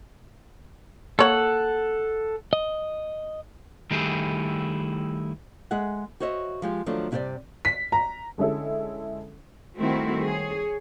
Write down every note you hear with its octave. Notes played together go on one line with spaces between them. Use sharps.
A#3 A4 C#5 F#5
D#5
D#3 G3 A3 E4 G4 G#4
G#3 G#4 E5 F#5
F#4 C5 C#5 D#5 E5
F3 G#3 G4
D#3 F3 F#3 A3 D4
G2 C3 E4 G4 C5 D5
B6
A#5
D3 G#3 C#4 E4 A4
D#3 G3 A3 C4 E4 F#4
G#4 C#5